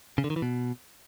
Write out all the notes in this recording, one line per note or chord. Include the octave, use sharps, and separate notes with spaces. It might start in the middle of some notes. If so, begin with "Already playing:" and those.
C#3
D3
D#3
E3
B2